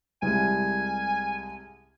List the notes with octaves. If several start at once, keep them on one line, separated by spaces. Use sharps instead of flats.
C2 C3 G#3 G#5